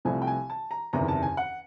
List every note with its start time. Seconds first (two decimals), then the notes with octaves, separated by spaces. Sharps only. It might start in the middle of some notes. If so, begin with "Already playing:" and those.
0.05 C2 C3 F3 A3 C4 G#5
0.22 G5
0.27 G#5
0.50 A5
0.71 A#5
0.93 F#1 E2 C3 D#3 A#5
1.08 A5
1.22 G#5
1.37 F#5